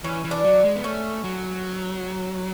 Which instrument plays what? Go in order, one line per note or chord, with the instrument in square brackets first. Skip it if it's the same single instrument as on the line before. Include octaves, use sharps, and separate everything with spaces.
[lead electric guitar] E3 [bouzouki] C#4
[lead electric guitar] E3
[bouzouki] D4
[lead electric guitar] F#3
G#3
B3
[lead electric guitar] A3 [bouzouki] C#4
[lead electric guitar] F#3